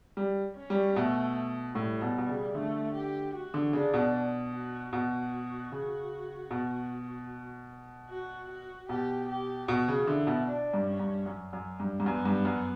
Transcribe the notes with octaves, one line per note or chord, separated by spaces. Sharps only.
G3
C#4
G3
B2 A3
A2 G3
B2
B2
C#3
D3 A3
G4
F#4
D3
C#3 D4
B2
F#4
B2 F#4
C#3
B2
F#4
F#4
B2 G4
G4
B2 F#4
C#3
D3 E4
B2
D4
G2
C#4
G2
F#2
F#2
G2
G2
F#2 B3
G2
F#2